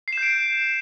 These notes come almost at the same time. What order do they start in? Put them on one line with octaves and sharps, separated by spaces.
C7 E7 G6 D7